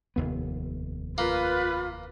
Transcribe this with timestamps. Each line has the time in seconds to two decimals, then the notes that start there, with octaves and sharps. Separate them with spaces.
0.16 F1 D#2 B3
1.18 A#3 F4 B4